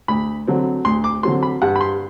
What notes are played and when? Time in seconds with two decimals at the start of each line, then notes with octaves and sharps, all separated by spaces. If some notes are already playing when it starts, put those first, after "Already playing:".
0.08 D2 B5
0.47 D3 F#3 C4
0.85 D2 C6
1.04 D6
1.23 D3 F#3 C4 C6
1.43 B5
1.62 G2 F#5
1.76 B5
1.81 C6